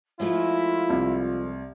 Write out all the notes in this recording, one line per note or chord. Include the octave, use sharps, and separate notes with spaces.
F3 G#3 A3 E4 F4
C2